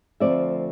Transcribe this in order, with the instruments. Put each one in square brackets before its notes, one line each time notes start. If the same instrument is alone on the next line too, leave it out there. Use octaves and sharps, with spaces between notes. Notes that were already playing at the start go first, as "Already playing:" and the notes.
[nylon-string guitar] D2 C#3 F3 A3 C4 D5 E5